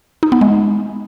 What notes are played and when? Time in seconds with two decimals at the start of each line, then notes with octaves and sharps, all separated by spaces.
0.23 D#4
0.32 B3
0.41 G#3